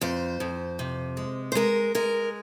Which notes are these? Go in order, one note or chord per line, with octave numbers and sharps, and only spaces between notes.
F2 C5
F2
C3
G#3
C5
G#3 A#4
G#3 A#4